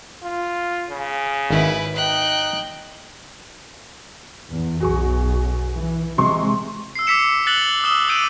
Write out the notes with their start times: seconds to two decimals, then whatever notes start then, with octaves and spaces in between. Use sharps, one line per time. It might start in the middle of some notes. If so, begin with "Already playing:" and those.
0.23 F4
0.90 C#3
1.50 G#1 D#3 E4 B4
1.95 D#4 G5 F#6
4.51 E2
4.81 B1 F#2 F#4 G#4 C#6
5.75 E3
6.18 C3 G#3 C6 C#6
6.95 E6 C7
7.07 D6 E6 B6 C#7 E7
7.47 F#6 A6 C#7 F#7 G7
7.84 D#6 E6 E7 G7
8.08 D6 E6 G6 D7 D#7 F#7